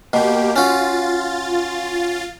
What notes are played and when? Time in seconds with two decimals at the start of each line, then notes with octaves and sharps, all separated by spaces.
0.13 B2 A#3 G4
0.56 C#4 F4 F#4 A6